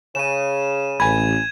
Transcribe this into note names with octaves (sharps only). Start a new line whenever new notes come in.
C#3 D#7 E7
A1 G#5 B5 G#6